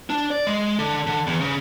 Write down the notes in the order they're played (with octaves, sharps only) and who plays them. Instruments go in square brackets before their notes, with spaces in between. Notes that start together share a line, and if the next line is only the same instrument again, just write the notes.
[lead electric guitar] D4
D5
G#3
D3
D3
E2
C#3